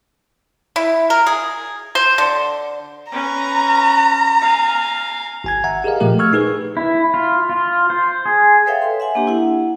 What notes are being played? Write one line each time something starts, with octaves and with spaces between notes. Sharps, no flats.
E4
A#4
G#4
C5
D3
C#4 B4 A#5
F5 G#5
G#1 G#5 G#6
E5 F#5 A#5
G4 G#4 A#4 D#5 F5
A#2 F3 A3 G4 A#4
C#6 E6 F6 G#6
D#4 G#4 B4
E4
F4
F4
C5
G#4
A4 B4 C#5 E5 F5 G5
C6
E5 F#5 G#5
A#3 D4 G4
E4 F#5